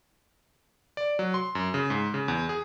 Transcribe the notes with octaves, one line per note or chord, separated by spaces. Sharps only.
D5
F#3
C6
F#2
C#3
G#2
C#3
E2
G#4